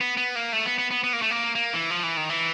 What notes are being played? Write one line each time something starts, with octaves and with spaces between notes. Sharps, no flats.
B3
B3
A#3
A3
B3
B3
B3
B3
A#3
A3
A#3
A#3
E3
F3
E3
D#3
E3